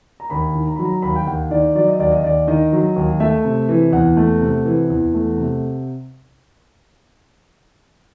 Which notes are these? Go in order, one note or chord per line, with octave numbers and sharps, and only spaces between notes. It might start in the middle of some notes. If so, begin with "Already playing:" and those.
A#5
D#2 B5
D#3
A#5
F#3 B5
A#5
D#2 B5
G5
D#2 F#5
D#3 D5
F#3 D5
D#5
D#2 D5
D#5
D#2 D5
D#3 D#5
F#3
D#2
A3 E5
C3
E3
E2 F#5
A3
C3
E3
E2
A3
C3